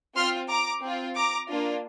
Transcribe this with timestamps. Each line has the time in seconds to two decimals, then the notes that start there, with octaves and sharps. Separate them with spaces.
0.15 C4 F4 C6 F6
0.49 A#5 D6
0.82 C4 F4
1.16 A#5 D6
1.50 A#3 D4 F4